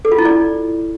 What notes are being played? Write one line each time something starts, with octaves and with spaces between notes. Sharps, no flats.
A4
F4
E4
D5